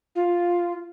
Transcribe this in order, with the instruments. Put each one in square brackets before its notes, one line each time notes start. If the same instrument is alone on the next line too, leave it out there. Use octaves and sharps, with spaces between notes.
[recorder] F4